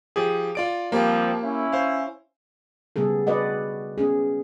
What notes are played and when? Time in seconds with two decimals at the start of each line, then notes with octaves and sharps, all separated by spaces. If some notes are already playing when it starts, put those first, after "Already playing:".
0.16 F3 G4 G#4
0.55 F4 D5 D7
0.92 F3 G3 A#3 C4 G4
1.43 C#4 E4
1.72 C5 F5
2.96 C#3 G3 B3 G#4 A4
3.27 F#4 B4 D5 D#5 F#5
3.98 B3 C#4 G#4